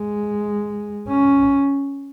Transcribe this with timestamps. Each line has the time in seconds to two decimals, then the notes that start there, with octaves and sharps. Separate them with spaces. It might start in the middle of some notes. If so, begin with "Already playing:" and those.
Already playing: G#3
1.08 C#4